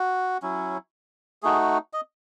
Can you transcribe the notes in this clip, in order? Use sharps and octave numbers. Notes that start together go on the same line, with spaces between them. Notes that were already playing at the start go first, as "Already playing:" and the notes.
Already playing: F#4
F#3 C#4 E4
A3 D#4 F#4 G#4
D#5